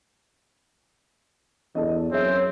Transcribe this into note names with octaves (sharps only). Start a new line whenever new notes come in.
E2 A4 D#5
F#2 C4 G#4 C#5 E5